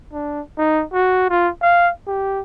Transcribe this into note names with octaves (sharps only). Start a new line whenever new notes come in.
D4
D#4
F#4
F4
F5
G4